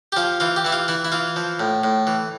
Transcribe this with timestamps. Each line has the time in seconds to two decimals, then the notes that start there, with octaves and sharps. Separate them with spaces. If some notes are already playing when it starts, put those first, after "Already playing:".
0.12 G4
0.16 F3 F4
0.40 E3 F4
0.56 G4
0.65 E3 E4
0.72 F4
0.88 E3 E4
1.05 E4
1.12 E3 F4
1.36 F3
1.60 A2
1.84 A2
2.07 E3